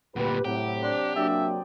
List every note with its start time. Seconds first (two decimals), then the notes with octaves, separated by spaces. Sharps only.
0.16 D2 A#2 F#4 G4 B4
0.45 A2 C3 F#3 G4
0.83 D4 F#4 C5
1.16 F#3 A#3 D4 G#4 D5 E5 G5